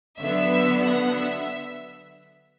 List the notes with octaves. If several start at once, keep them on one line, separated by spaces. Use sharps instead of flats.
D3 F#3 B3 E5
F#5
E5